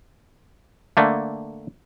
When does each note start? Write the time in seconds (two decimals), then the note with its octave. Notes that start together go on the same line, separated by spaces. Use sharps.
0.97 D3 A3 A#3